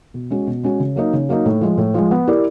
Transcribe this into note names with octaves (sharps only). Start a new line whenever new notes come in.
B2
G#3 C#4 F#4
B2
G#3 C#4 F#4
C#3
F#3 A#3 D#4
C#3
F#3 A#3 D#4
A2
F3 G#3
A2
F3 G#3
B3
E4 G4 A#4 D5